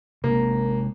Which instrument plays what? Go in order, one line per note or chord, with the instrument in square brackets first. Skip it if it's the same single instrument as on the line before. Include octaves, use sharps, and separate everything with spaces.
[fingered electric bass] C3 G#3 [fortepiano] A#3